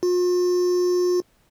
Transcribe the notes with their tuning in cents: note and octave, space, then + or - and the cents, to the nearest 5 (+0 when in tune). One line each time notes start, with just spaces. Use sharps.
F4 +45